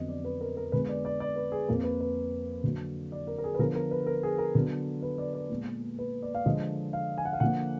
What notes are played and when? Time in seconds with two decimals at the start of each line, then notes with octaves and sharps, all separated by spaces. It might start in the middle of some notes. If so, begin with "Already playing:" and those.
Already playing: F2 D3 F#3 B3 D#5
0.09 D5
0.24 B4
0.41 A#4
0.57 A#4
0.72 D3 G#3 B3 B4
0.89 D5
1.05 D5
1.20 D5
1.36 B4
1.52 G#4
1.68 F2 F3 A#3 A#4
1.84 B4
2.01 B4
2.64 D3 F#3 A#3
3.12 D5
3.27 A#4
3.38 A#4
3.44 G#4
3.55 B4
3.59 D3 F3 B3 A#4
3.75 A#4
3.91 B4
4.06 A#4
4.23 G#4
4.38 A#4
4.55 D3 F#3 B3
5.02 B4
5.18 D5
5.34 D5
5.50 A#2 G#3 B3
5.99 B4
6.22 D5
6.35 F5
6.46 D3 F3 G#3 D#5
6.93 F5
7.18 G#5
7.25 F#5
7.33 F5
7.40 D3 F3 A#3 F#5